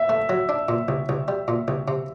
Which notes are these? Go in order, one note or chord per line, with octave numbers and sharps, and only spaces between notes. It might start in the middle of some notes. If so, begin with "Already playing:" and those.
Already playing: E5
A3
F#3
D4
A#2
C2
C2
G3
A#2
C2
C3